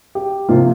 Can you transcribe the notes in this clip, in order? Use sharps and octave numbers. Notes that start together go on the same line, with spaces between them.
G4
C3 F3 A#3 F4